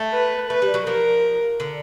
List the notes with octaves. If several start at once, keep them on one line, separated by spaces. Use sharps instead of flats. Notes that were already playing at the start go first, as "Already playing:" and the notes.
Already playing: A3
B4
A3 B4
G3
F#3
F3 A#4
D3